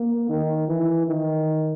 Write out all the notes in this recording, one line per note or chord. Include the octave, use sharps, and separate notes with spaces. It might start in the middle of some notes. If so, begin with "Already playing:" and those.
Already playing: A#3
D#3
E3
D#3